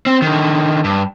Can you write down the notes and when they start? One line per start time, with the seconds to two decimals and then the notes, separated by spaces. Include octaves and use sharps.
0.06 C4
0.22 D3 D#3
0.84 G2